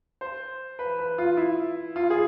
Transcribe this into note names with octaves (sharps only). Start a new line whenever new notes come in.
C5
B4
B4
F4
E4
F4
G#4